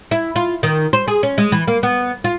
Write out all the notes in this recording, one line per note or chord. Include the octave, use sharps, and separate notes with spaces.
E4
F4
D#3
C5
G#4
C#4
G#3
E3
A#3
B3
F4